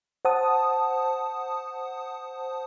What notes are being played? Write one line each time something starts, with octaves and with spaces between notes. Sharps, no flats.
C5 F#5 A5 D#6